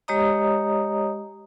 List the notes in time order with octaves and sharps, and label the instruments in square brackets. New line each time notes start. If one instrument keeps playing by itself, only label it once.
[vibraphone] G#3 G4 C#5 D#5 A#5 D#6